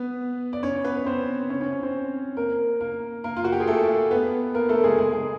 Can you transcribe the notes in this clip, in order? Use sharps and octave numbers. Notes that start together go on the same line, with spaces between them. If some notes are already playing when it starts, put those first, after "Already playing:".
Already playing: B3 B4
D5
C#4 C#5
B3 B4
B4
C4 C5
C#4 C#5
C#4 C#5
C#4 C#5
C4 C5
A#3 A#4
A#3 A#4
A#3 A#4
F4
F#4
G4
G#4
A3 A4
B3 B4
A#3 A#4
A3 A4
G#3 G#4
G#3 G#4
G#3 G#4